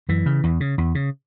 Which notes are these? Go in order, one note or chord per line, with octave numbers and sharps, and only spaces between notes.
F#2 E3
C#3
E2
C#3
E2
C#3